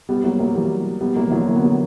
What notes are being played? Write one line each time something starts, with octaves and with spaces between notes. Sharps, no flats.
G3 B3
F#3 A#3
F#3 A#3
E3 G3
G3 B3
F#3 A#3
E3
D3 F#3
A#3
B3
F#3 A#3